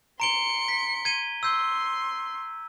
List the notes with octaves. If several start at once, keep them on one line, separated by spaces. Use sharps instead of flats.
A#5 C6 C#7 D7 G7
B6
G#6 D#7 G7
C6 E6 G6